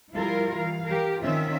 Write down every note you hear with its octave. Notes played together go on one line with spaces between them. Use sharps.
F3 G3 E4 F4 A#4 F5
E3 F5
G4 A#4
D#3 C4 C#4 F4 E5